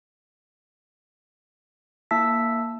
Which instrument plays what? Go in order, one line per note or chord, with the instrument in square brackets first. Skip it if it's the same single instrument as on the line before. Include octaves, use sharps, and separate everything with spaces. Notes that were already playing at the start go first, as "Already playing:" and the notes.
[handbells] A#3 E4 E5 A5 E6 B6